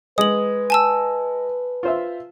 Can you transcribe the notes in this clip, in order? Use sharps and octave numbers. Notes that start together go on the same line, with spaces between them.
G#3 B4 D#6 F#7
G#5 A5 E6
F4 C5 E5